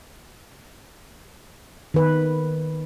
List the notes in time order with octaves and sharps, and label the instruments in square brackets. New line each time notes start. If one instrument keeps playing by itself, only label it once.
[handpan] D#3 B4